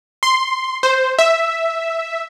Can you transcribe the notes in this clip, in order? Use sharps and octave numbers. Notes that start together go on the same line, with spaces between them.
C6
C5
E5